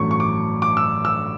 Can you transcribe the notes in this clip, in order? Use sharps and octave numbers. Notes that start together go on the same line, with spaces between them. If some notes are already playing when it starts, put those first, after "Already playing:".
Already playing: A1 G2 F#3 A3 C#6
C#6
D6
D6
E6
E6